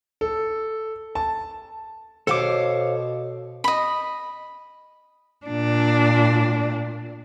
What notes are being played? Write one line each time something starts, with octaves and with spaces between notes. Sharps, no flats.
A4
A5
B2 A4 C5 C#5 F5 D6
D#5 B5
A#2 D4